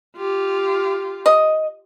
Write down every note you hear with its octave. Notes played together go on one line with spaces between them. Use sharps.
F4 G4
D#5